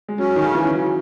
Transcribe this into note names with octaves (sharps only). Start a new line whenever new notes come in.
G#3
F#3 C#4
D#3
C#3
E3
C#3
F#3